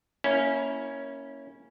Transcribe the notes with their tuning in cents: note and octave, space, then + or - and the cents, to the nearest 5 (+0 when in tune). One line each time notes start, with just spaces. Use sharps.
A#3 +0 C#4 +0 E4 -20